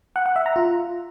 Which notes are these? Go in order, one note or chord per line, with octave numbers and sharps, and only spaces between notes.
F#5
F#5
E5
A#5
F4